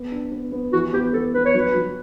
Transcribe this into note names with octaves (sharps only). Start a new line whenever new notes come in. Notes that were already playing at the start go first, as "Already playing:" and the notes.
Already playing: B3
D4
B3
B3
E3 F#4
B3 G4
B3 A4
B3 B4
C#5
F#3 B4
F#3